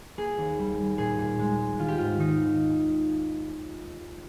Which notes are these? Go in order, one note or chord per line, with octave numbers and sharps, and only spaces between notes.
A#3 G#4
D#2
G3
G3
A#2 G#4
A#2
G#3
G#3
D#3 F4
G4
G#2 F4
D#3 D#4